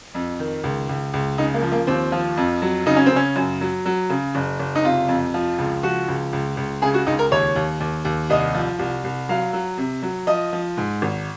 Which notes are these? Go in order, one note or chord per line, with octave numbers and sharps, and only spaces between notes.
F2
D#3
C#2
C#2
C#2
C#3 D#4
A#3
F3
A#3
D#2 C4
F3
F2
F#3
C#3 D#4
C#4
C4
C#3 C#4
F#2
F#3
F#3
C#3
F#1
F#1
D#4
C3 F4
F2
F3
C#2
F3 F#4
C#2
C#2
C#2
C#3 G#4
F#4
C#2 D#4
A#4
D#2 C#5
D#2
D#2
D#2
C2 D#5
F3
C2
C2
F#3 F5
F#3
C3
F#3
F3 D#5
F3
G#2
G#1